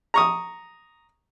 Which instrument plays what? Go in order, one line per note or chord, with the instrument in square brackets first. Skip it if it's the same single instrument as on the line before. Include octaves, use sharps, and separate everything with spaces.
[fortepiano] A#5 C#6 D#6